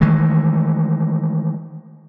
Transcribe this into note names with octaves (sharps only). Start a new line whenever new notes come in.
D#3 E3 G#3 A3